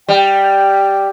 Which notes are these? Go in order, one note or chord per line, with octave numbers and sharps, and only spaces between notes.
G3 G5